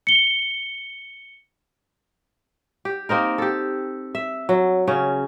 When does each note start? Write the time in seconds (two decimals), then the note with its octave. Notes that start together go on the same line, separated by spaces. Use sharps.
0.07 C#7 G7
2.85 G4
3.09 A#3 C4 D#4 A#4
3.38 G4 A4
4.15 E5
4.49 F#3
4.87 C#3 C#4